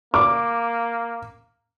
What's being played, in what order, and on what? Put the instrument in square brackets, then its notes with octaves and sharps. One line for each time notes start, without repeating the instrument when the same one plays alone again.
[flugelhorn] A#3 [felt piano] D6